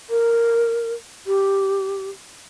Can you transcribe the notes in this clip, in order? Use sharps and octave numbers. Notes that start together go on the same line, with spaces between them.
A#4
G4